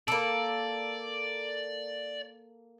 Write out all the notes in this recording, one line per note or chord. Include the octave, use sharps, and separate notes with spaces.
A#3 A4 D5